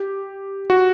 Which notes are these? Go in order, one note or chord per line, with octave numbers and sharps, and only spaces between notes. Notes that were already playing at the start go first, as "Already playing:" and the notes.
Already playing: G4
F#4